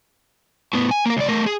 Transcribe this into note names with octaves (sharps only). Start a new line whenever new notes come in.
A2 B3
G#5
A#3 A#4
C#2 D5
A3 A#4
G#4